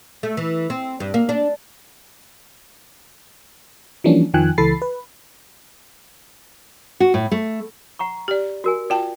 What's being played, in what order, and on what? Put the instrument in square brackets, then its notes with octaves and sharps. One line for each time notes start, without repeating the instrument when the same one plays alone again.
[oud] A3
E3
C4
G2
A#3
D4
[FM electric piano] E3 F3 G3 A#3 C#4 D4
F2 D#3 F3 G5 G#5 F#6
C#2 E3 A4 B5 A6 C7
B4
[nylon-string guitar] F#4
A2
A3
[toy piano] F#5 A#5 C#6
[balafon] G4 D5
[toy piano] F#4 A#4 G#5
[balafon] F4 G5 A5 [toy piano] D5